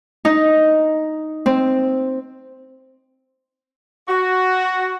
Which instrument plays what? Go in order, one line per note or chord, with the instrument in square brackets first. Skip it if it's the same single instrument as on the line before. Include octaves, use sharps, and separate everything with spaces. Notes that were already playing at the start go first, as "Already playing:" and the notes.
[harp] D#4
C4
[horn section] F#4